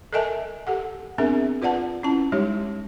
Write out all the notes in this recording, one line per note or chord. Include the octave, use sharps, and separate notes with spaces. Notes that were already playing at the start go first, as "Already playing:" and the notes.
A4 A#4 D#5 E5 G#5 A5
G4 A4 F#5
B3 C4 D4 G#4 A#4 E5
F4 B4 D5 F#5 A5
C#4 E4 A5
G3 G#3 D#4 G4 C#5